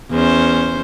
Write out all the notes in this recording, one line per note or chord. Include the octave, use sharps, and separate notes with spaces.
E2 C#4 C5